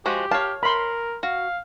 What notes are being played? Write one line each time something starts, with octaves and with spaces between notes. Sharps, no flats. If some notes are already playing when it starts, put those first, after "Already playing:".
F3 G#3 F#4 G4
C#5 F5 A5
A#4 B5 C6
F#4 F5